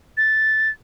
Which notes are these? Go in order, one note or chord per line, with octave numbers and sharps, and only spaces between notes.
A6